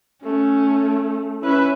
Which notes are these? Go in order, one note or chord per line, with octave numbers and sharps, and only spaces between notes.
A3 C#4
C#4 E4 B4 E5